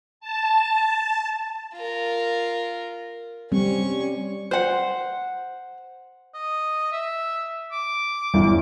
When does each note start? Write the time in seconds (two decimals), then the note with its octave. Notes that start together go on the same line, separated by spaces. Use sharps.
0.20 A5
1.74 F4 A#4
3.52 G3 C4 C#4 C#6
4.51 C5 F#5
6.34 D#5
6.92 E5
7.72 D6
8.34 G1 E2